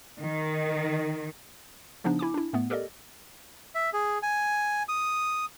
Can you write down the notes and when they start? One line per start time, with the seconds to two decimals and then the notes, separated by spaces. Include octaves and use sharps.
0.20 D#3
2.04 C#3 F3 B3 D4 D#4
2.19 E4 G#5 D6
2.34 D4 E4
2.53 A2 A3 B3
2.70 G4 A4 A#4 D5 D#5
3.75 E5
3.93 G#4
4.23 G#5
4.89 D#6